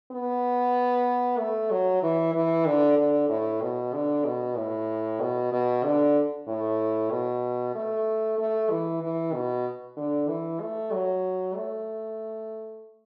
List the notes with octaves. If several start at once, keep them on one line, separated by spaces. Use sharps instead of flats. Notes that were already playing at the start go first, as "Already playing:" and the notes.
B3
A3
F#3
E3
E3
D3
D3
A2
B2
D3
B2
A2
B2
B2
D3
A2
B2
A3
A3
E3
E3
B2
D3
E3
A3
F#3
A3